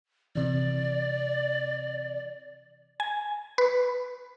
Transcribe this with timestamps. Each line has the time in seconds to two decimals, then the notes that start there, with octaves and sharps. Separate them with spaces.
0.35 C3 E3 D5
3.00 G#5
3.58 B4